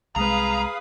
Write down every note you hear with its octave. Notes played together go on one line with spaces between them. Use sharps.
C2 G#3 G#4 B4 F5 A#5 D#6